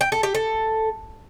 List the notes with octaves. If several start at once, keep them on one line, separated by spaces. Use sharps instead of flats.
G5
A4
G4
A4